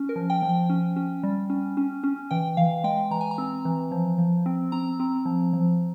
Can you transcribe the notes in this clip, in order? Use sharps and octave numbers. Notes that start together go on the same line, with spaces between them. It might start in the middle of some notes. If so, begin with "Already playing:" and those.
Already playing: C#4
A#4
F3
G5
F3
G5
C#4
C#4
G3
C#4
C#4
C#4
E3 G5
E3 F5
G#3 G5
E3 A#5
G#5
A#5
C4
E3
F3
F3
C4
C4 A#5
C4
F3
F3